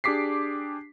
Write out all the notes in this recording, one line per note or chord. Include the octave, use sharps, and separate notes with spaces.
D4 G4 G#4 D6 B6 C7